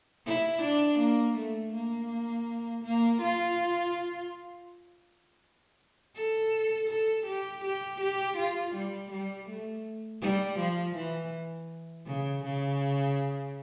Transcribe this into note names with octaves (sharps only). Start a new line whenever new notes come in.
E4
D4
A#3
A3
A#3
A#3
F4
A4
A4
G4
G4
G4
F4
G3
G3
A3
G3
F3
E3
C#3
C#3